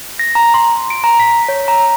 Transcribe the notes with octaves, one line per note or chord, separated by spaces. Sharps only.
A#6
A#5
C6
D7
A#5
B6
C#5
A#5